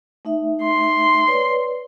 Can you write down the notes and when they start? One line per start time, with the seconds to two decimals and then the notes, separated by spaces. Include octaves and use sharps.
0.25 A3 D#4 E5
0.63 C6
1.27 B4 C#5 D5